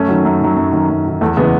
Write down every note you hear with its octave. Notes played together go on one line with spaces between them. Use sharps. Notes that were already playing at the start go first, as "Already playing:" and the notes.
Already playing: F#2 A3 C#4
D#3 F#3
F#2
D#3 F#3
F#2
D#3 F#3
F#2
D#3 F#3
E2 A3
C#3 E3 G#3 B3